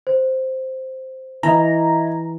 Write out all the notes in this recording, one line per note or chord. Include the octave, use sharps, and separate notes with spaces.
C5
E3 E4 D#5 A#5